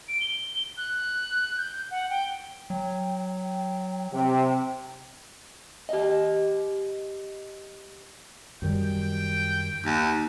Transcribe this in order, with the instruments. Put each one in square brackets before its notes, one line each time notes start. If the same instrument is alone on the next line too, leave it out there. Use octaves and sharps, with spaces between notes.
[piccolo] D7
G7
F#6
G6
F#5
G5
[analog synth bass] F#3 [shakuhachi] G5
[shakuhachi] G5
[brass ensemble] C3 [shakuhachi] G5
[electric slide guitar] G4 D#5
[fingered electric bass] F#2 D#3 G3 [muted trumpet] G5
[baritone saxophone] D#2